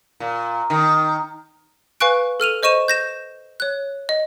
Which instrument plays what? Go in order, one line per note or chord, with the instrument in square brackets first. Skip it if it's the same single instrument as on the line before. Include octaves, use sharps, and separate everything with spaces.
[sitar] A#2
D#3
[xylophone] B4 F5 G#5 C#6 F#6 D7
A4 F6 D#7 F7
C5 D#5 C#6 D#7 E7
G6 A#6 E7
C#5 F#6
D#5